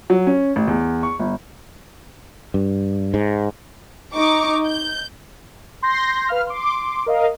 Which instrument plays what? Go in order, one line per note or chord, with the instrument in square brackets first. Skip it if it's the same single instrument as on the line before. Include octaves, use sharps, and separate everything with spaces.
[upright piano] F#3
C#4
A1
E2
C#6
G1
[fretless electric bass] G2
G#2
[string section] D#4 C#6 D6
G6
[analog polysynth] C6 G6 A#6
B4 F5 F6
C6 D6
A#4 D#5 F5